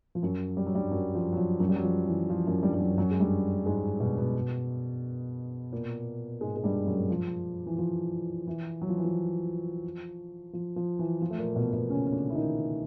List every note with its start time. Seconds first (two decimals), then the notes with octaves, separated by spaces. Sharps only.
0.15 F3
0.23 F#2 F#3
0.57 G3
0.66 F#3
0.75 G2 G3
0.91 F#2 F#3
1.15 F3
1.33 F#3
1.37 F3
1.60 F#2 F#3
1.69 G3
1.76 F#3
1.83 F3
2.06 E3
2.30 F3
2.46 F#2 F#3
2.63 G2 G3
2.74 G3
2.80 F#2 F#3
2.97 F#2 F#3
3.11 G#3
3.20 G2 G3
3.66 G#2 G#3
4.00 B2 B3
4.18 B2 B3
5.72 A#2 A#3
6.41 G#2 G#3
6.56 G#3
6.64 G2 G3
6.86 F#2 F#3
7.10 F3
7.66 E3
7.78 F3
8.47 E3
8.82 F#3
8.89 F3
8.97 E3
9.04 F3
10.53 F3
10.76 F3
10.99 E3
11.22 F3
11.30 A3
11.38 A#2 A#3
11.55 B2 B3
11.73 B2 B3
11.90 C#3 C#4
12.07 C#4
12.12 D3 D4
12.30 E4
12.35 D#3 D#4